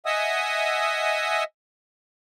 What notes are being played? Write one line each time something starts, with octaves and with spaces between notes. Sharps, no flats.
D#5 E5 F#5 G#5 D#6 E6